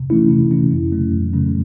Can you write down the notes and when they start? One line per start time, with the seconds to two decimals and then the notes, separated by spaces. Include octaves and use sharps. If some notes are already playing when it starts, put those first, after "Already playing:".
Already playing: C3
0.10 E3 A3 C#4 E4
0.30 C3
0.51 E3 A3 C#4 E4
0.72 F2
0.92 C#3 F#3 A3 C#4
1.12 F2
1.33 C#3 F#3 A3 C#4